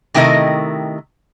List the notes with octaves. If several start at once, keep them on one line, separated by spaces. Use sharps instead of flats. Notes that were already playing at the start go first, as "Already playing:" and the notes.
C3 D#3 A3 E4 A#4 D#5